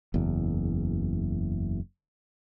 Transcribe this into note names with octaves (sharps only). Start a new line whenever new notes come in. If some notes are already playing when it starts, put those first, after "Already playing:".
F#1 E2